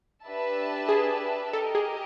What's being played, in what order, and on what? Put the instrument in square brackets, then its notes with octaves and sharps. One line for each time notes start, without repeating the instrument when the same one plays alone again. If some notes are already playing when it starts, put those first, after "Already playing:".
[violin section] D4 G4 B4 E5 A5
[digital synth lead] G#4
[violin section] G4 A#4 D#5 [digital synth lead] A4
[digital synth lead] G#4